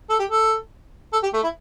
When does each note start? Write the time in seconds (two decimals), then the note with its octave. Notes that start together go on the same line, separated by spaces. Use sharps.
0.09 A4
0.19 G4
0.30 A4
1.13 A4
1.23 G4
1.33 A3
1.43 E4